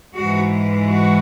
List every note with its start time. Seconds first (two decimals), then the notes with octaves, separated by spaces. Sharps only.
0.15 G#2 E3 G#3 F#4
0.90 F#4